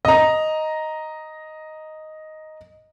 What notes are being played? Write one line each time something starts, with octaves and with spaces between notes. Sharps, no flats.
D#5 A#5